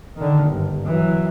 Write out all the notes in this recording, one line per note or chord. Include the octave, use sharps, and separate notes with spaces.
D3 D#3
G1
E3 F#3